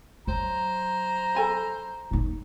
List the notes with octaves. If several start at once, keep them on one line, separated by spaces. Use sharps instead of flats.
F#3 C5 A#5
A4 G#5 B5
D#4 E4